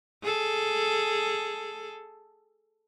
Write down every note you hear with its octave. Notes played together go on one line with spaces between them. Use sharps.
G#4 A4